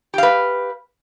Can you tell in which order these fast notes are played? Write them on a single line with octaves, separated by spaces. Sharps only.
G4 F5 B4